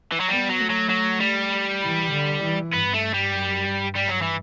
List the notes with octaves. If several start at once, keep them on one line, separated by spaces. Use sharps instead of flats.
E3
F#3
G3 B3
F#3
A3
F#3
F#3
G3
E3
D3
E3
G2 B3
A3
G3
F#2
G2
G3
F#3
E3